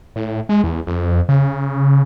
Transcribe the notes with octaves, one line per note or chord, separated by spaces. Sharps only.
A2
G#3
E2
F2
C#3